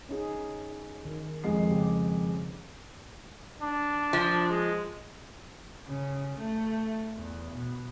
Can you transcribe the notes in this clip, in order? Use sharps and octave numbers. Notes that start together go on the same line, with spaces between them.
C#4 D#4 G#4
D#3
F2 G#3 C7
C#3 G4
D4
F3
G#3
C#3
A3
E2
B2